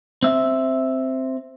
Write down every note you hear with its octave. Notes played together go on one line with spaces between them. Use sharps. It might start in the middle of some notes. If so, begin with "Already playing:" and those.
C4 E5